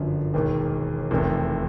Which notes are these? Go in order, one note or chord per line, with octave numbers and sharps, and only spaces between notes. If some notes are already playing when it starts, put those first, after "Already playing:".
Already playing: G1 F#2 D3 F3
E1 D#2 D#3
F1 E2 C3 D#3